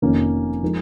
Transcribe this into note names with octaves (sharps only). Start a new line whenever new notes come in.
F1 F2 D#3 A#3 C#4
F3 G#3 D#4 A#4